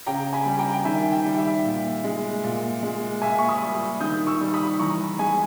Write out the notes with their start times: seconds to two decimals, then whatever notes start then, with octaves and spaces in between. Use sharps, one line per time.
0.06 C#3 G5 A#5
0.33 G#5 B5
0.46 G3
0.59 G5 A#5
0.74 G5
0.85 D#3 E5 G#5
1.12 G5
1.25 G3
1.34 G5
1.38 E5
1.65 A#2
2.04 G#3
2.44 A#2
2.83 G#3
3.22 A#2 E5 G#5
3.39 C#6
3.49 B5 D#6
3.62 G3
4.00 D#3 D#6 G6
4.27 C#6 E6
4.41 G3
4.54 B5 D#6
4.79 E3 A#5 C#6
5.19 G#3 G#5 B5